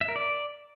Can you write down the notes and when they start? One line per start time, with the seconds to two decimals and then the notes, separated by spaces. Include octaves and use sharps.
0.01 E5
0.08 A#4
0.16 D5